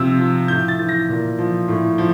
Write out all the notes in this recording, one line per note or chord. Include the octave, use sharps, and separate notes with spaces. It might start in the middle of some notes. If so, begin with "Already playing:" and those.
Already playing: C3 F3 E6
F3
A2 G6
A6
E3
A#6
A#2
F3
A2
F3